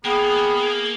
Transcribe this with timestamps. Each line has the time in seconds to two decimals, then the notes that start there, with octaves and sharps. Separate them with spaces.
0.05 A#3 B3 G#4 G5 D#6